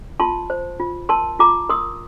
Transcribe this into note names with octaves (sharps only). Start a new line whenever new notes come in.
F4 A5 C6
C5
F4
A#4 A5 C6
F4 A#5 D6
A#4 C6 D#6